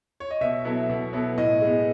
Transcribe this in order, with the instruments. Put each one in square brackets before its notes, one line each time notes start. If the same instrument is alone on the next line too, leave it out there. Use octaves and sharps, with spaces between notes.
[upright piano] C#5
D#5
[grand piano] B2 [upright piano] E5
[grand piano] F#3 B3 E4 A4
B2
F#3 B3 E4 A4
[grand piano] A2 [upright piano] D#5
[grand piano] G#3 B3